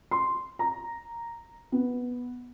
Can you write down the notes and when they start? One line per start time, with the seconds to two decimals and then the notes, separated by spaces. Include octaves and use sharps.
0.11 C6
0.59 A#5
1.72 B3